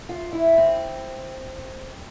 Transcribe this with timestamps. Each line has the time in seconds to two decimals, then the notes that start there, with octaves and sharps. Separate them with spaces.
0.09 F4
0.33 E4
0.58 C4